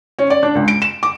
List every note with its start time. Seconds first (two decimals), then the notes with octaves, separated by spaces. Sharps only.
0.19 C#4
0.30 D5
0.43 D4
0.55 C#2
0.68 D7
0.82 E7
1.03 D6